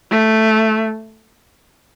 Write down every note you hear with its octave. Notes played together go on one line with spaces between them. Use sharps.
A3